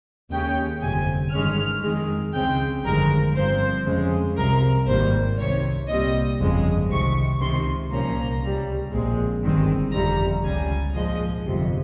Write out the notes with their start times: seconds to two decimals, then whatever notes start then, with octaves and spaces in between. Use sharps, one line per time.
0.31 D#2 C#3 G#3 C#4 G5
0.82 G1 F2 C3 G#5
1.33 G2 D#3 G#3 C#4 F6
1.83 F2 D#3 G#3
2.34 C#2 C#3 G#3 C4 G5
2.84 G1 F2 D#3 G#3 A#4
3.35 G1 G2 F3 C4 C5
3.86 F2 C#3 G#3
4.37 C2 C3 F3 A#4
4.87 G#1 G2 D#3 G3 A#3 C5
5.37 C2 C3 D#3 C#5
5.88 C2 A#2 G3 C4 D#5
6.39 G1 F2 C#3 G#3
6.90 C2 C3 D#3 C#6
7.40 C#2 C3 D#3 C6
7.90 C2 A#2 F3 A#3 C#4 A#5
8.41 C#2 C#3 G3
8.92 A#1 A#2 G#3 C4
9.43 G1 G2 D#3 G#3 C4
9.93 G1 F2 C3 G3 A#5
10.44 C#2 C#3 G3 G#5
10.95 A#1 G#2 F3 G#3 D#5
11.46 G1 F2 C3